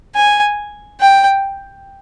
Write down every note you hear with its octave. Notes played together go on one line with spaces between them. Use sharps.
G#5
G5